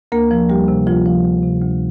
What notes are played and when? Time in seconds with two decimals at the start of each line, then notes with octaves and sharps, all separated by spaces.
0.12 D2 A#3 A#4
0.31 F3
0.49 D2 G3 G4
0.68 C3
0.87 D2 F3 F4
1.06 F3
1.24 D2
1.43 C3
1.61 D2